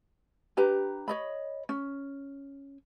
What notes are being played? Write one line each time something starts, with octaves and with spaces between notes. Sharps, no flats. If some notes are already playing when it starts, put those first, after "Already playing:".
D4 G4 B4 A#5
C#5 D#5 B5
C#4